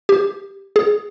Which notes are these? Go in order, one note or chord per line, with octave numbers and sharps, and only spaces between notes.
G4
G#4